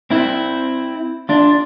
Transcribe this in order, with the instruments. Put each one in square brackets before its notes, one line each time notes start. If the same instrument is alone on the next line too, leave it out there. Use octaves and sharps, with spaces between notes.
[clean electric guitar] C4 E4
D4 F4